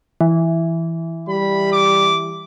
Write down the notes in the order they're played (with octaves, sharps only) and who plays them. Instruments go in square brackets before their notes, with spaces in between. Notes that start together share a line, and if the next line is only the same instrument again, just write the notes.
[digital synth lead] E3
[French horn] G3 [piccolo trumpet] B5
[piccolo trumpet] D6